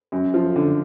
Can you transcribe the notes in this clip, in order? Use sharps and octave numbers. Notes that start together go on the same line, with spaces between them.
F#2
F3
D3